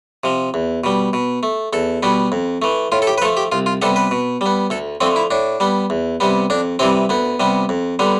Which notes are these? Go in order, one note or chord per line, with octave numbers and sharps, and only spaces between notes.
C3 F3
E2
B2 G3
B2
A3
E2 A4
B2 G3 B3
F2
E3 A3
A2 F4
A4
G4
B4
F3 A3 A4
G4
C2 F4
F4
C3 G3 B3 A4
B4
B2
G3 B3
D2 A4
D3 F3 A3 C4
E4
A2 D4
G3 B3
E2
C3 G3 B3
F2 D4
C3 E3 G3 C4
D2 B3
C3 G3 B3
F2
D3 G3 B3